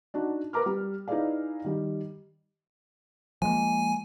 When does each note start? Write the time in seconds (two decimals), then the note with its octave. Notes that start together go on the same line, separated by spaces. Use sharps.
0.14 D4 D#4 F#4
0.53 A#4 B4 A#5 D6 F6
0.66 G3
1.08 D#4 E4 G#4 B4 D5 F5
1.64 D#3 G3 G4
3.42 F3 G#3 A#3 G#5